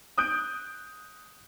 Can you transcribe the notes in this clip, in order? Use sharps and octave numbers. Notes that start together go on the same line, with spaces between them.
D#6 F#6 G6 D7